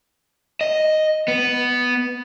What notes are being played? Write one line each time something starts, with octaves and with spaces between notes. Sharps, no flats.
D#5
B3